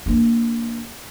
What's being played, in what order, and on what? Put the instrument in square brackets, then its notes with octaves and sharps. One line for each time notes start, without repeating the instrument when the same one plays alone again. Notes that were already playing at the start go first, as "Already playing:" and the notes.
[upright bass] A#3 D4